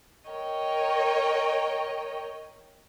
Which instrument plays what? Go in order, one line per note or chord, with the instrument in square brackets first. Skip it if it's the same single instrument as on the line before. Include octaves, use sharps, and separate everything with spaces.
[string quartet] A#4 C#5 D#5 G5